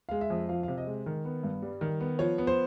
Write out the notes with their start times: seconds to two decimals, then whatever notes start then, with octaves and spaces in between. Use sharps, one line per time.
0.09 G#3 F5
0.21 E5
0.30 F2
0.49 F3 F5
0.63 C3 F5
0.78 D#5
0.87 G#3
1.06 D#3
1.25 B3
1.43 G2
1.62 G3
1.81 D#3
2.00 B3
2.19 F3 C#5
2.38 B3
2.47 C5